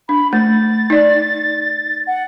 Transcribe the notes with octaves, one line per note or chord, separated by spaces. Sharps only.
D4 B5
A3 A6
D#4 D5
F#5